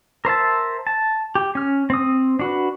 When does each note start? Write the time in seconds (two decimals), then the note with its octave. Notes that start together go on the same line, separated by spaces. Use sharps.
0.25 A#4 C5 E5 A5
0.87 A5
1.35 G4
1.55 C#4 F6
1.90 C4 D#6
2.39 D4 F#4 B4